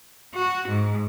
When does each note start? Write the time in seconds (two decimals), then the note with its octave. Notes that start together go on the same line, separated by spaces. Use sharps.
0.34 F#4
0.68 G#2